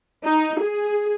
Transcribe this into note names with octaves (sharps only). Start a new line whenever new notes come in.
D#4
G#4